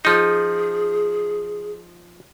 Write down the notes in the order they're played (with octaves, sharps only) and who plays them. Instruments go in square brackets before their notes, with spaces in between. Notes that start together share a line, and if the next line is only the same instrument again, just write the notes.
[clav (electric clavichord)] F3 D#4 [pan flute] G#4